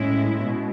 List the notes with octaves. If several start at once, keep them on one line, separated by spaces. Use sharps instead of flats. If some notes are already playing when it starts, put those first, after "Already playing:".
Already playing: A2 G#3 C#4 E4
B2 G#3